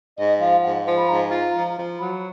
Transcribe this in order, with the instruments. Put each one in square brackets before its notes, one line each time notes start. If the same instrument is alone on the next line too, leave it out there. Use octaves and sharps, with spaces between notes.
[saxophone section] G#2 [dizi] D#5
[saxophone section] F3 [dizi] F5
[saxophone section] G#2 [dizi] F#5
[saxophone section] F3
[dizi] B5
[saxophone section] G#2 [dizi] A#5
[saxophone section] F4
F3
F3
[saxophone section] F#3 [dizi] B5